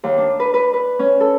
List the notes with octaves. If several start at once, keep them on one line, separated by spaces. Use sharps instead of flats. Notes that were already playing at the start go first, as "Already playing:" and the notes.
D#2
D4
B4
B4
B4
C#4
A4